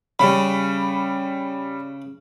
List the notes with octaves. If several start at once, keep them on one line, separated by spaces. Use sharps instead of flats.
C#3 G3 B5